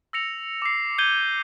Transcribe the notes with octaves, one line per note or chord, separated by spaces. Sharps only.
E6 A#6 C#7 F7
D6 C7
G6 G#6 D#7 G7